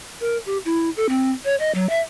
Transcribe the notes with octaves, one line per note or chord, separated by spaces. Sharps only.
A#4
G4
E4
A4
C4
C#5
D#5
F#3
E5